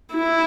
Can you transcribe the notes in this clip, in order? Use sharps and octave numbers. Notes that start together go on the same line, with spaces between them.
E4